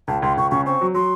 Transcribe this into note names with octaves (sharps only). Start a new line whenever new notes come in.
C#2 A5
C#2 C6
C#2 C#6
C#3 C#6
C4 C#6
F#3
F#3 C6